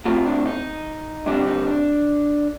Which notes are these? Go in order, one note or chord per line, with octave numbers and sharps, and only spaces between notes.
A2 A3 C4 F4
D4
D#4
G2 D3 G3 C4 D4
D#4
D4